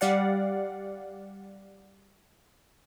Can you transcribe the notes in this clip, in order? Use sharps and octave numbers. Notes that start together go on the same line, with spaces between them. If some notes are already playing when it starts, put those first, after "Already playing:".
G3 G4 D5 F5 F#5